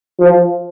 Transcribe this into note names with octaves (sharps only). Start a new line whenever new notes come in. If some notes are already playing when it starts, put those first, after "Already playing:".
F3